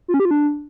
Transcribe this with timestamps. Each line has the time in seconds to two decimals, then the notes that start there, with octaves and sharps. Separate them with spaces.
0.08 F4
0.14 C#4
0.20 G4
0.25 F4
0.31 D4